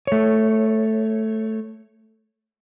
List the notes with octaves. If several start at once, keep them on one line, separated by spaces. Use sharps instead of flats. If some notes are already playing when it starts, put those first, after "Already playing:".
A3 C#5